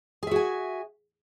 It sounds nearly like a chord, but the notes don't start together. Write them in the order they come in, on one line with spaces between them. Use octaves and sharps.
G#4 E5 F#4 G#5